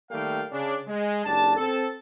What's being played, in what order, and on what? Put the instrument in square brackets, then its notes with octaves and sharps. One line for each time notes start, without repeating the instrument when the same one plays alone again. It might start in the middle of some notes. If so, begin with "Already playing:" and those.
[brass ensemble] D#3 G3 A3 A#3 F5 G5
C#3 C#4 D4
G#3
F#1 D4 G4 A5
C4 A4